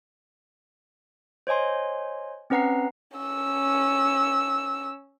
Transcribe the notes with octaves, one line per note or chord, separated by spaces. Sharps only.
C5 C#5 D#5 G#5 C6
C4 C#4 B4 F#5 A#5 C7
C#4 E6